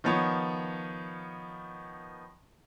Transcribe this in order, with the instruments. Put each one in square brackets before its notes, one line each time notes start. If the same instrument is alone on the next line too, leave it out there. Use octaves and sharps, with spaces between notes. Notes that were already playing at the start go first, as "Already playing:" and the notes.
[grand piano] D#3 F3 B3 C#5